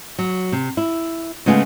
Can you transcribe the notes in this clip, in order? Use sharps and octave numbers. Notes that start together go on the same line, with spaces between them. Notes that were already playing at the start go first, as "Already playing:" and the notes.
F#3
C3
E4
C#3 G#3 A3 B3 F4 G#4